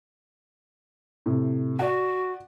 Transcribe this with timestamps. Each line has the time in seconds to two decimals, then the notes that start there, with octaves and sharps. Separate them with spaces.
1.26 A2 C3
1.79 F#4 D5 F#5